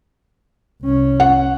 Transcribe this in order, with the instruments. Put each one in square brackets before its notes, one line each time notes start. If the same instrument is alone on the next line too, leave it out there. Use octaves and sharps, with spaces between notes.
[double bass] C2 C#4
[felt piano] F#5